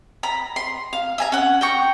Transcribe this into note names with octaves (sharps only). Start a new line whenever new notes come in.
A#5 B5
C6
F5
E5 G#5 A#5
C#4 F#5
G5 A#5 C#6